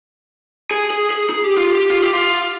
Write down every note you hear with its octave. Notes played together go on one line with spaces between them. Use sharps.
G#4
G#4
G#4
G#4
G4
F4
G4
F4
G4
F4